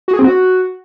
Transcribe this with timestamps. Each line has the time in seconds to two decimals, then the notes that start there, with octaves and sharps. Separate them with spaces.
0.08 F#4
0.13 G#4
0.19 C4
0.24 F#4